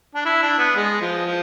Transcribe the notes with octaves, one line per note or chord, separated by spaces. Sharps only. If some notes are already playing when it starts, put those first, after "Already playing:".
D4
E4
D4
B3
G#3
F3
F3